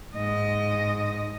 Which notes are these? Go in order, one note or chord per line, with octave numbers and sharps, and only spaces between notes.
G#2 D#5